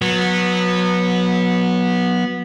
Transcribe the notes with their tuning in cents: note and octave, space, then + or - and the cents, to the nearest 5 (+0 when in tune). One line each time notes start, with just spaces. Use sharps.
F#3 -25 B3 -15